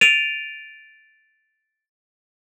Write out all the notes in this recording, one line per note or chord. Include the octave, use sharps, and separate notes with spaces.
A6 D7 D#7 F7